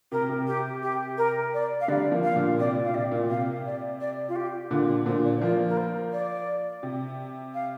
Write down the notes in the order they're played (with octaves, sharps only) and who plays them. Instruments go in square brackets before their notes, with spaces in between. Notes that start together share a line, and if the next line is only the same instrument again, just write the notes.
[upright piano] C3 [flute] A#4
[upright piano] C3
[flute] G4
G4
A#4
D5
F5
[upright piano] D3 G3 [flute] D5
[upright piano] F3 A#3
[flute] F5
[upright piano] A#2 D3
[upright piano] C3 [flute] D5
[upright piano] A#2
[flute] F5
[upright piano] C3 [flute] D5
[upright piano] A#2
[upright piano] C3 [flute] F5
[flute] D5
D5
F4
G4
[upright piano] A#2 D3 [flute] F4
[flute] G4
[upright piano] A#2 D3 [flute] C5
[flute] D5
C5
[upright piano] F3 A#3 [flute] D5
[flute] A#4
C5
D5
[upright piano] C3
[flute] F5